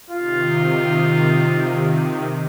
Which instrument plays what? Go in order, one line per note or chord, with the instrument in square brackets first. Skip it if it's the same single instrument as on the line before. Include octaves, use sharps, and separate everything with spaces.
[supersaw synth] C3 D#3 [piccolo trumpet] F4